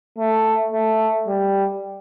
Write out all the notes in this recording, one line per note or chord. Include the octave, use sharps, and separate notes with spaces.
A3
A3
G3